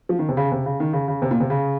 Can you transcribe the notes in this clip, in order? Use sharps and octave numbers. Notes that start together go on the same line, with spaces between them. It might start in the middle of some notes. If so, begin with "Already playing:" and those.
F3
D#3
C3
C#3
C3
C#3
D#3
C#3
C#3
C3
A#2
C3
C#3